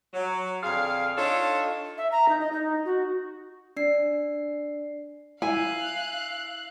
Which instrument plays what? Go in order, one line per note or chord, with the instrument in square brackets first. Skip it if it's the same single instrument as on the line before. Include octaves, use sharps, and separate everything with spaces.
[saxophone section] F#3
F2 D3 G#4 F5
D4 D#4 F4 A4 C#5
[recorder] E5
A#5
D#4
D#5
D#4
F#4
[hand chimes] D4 C7 [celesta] D5
[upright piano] E4 [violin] F5 F#6 [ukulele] G#5